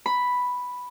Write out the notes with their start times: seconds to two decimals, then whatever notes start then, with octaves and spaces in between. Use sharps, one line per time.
0.06 B5